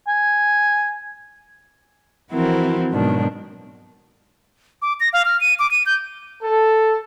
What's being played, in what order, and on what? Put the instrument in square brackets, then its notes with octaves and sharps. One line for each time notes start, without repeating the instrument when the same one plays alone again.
[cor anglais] G#5
[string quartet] E3 F3 C4 E4 F#4 A#4
G#2 B2 D#3 F#3 D4
[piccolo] D6
A#6
F5
F6
D#7
D6
D#7
G6
[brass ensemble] A4